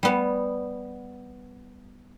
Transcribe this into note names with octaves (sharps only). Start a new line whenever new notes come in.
G3 B3